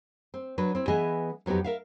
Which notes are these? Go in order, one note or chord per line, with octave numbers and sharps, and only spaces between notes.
C4
F#3 D4 B4
C4 E4
E3 B3 G#4 D#5 E5 G#5
F2 F#3 B3 D#4 G4
A#4 E5 F5